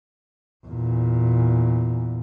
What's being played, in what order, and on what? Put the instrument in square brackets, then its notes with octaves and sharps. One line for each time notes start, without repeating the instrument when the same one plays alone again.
[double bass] E2 A#2